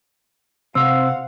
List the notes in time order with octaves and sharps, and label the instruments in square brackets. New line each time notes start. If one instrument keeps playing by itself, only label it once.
[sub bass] C3 [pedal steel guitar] C4 C6 [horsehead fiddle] F5 F#5 [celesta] E6